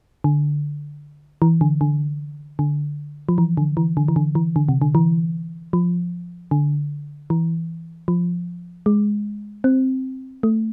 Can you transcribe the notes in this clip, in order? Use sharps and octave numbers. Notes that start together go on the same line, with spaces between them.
D3
E3
D3
D3
D3
F3
E3
D3
E3
D3
E3
D3
E3
D3
C3
D3
E3
F3
D3
E3
F3
G#3
C4
A3